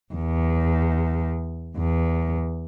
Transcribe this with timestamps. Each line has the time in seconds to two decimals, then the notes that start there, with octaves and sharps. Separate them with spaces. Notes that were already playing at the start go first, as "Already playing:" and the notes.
0.14 E2
1.77 E2